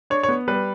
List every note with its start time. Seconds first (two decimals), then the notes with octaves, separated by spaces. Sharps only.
0.10 D4 C#5
0.23 C#5
0.29 B3
0.48 G3 B4